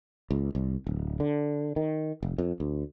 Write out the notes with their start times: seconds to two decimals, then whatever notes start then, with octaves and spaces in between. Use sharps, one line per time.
0.31 C#2
0.55 C2
0.87 D1
1.20 D3
1.76 D#3
2.23 F1
2.38 F2
2.60 D2